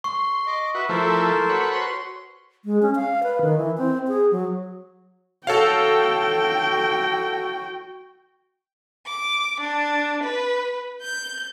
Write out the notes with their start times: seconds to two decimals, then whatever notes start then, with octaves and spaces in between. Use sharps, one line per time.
0.04 C6 C#6
0.47 D#5 D6
0.75 F#4 B4 E5
0.89 F3 A3 E4 A4 A#4 C5
1.49 F#4 B4 C#5
1.72 C6
2.65 G#3
2.82 C#4
2.96 F5
3.23 B4
3.41 D#3
3.58 E3
3.78 C4
4.08 G#4
4.31 F#3
5.47 F#4 A4 C#5 F5 G5
9.06 D6
9.61 D4
10.23 B4
11.02 G6